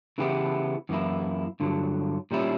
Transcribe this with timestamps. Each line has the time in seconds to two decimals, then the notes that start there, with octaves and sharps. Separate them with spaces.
0.18 C#3 E3 B3 E4 G4
0.89 F#2 E3 A#3 E4
1.60 G2 D3 F#3
2.31 A#2 G3 C#4 E4